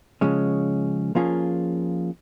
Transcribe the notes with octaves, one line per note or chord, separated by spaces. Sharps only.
C#3 F3 G#3 C#4
F3 A#3 C#4 F4 G#4